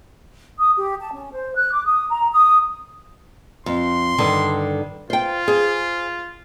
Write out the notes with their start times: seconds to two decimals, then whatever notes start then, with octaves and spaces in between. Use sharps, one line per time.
0.58 D#6
0.77 G4
1.00 A5
1.13 C#4
1.33 C5
1.56 F#6
1.73 D6
1.86 D#6
2.10 A#5
2.32 D#6
3.66 F2 C6
4.18 G2 D3 D#3
5.10 F4 C5 G5
5.48 G#4 C5